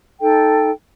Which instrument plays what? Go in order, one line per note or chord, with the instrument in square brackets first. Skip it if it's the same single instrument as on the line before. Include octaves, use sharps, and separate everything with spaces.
[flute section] D#4 A4 G5